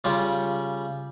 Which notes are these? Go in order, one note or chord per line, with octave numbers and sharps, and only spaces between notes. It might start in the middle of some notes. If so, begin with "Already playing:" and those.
C#3 G3 F4